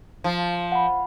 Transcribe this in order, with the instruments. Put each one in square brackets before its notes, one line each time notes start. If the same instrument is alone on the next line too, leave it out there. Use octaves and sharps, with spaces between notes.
[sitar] F3
[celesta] F#5 B5